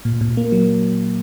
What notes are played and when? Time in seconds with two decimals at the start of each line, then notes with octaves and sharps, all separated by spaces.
0.05 A#2
0.21 A#2
0.37 A#3
0.52 F#3